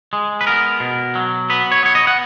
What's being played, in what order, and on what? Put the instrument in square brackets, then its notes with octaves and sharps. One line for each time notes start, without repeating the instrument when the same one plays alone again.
[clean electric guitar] G#3
B4
B3 A#4
B2
F#3
B3 B4
C#5
B3 C#5
D#5
F#5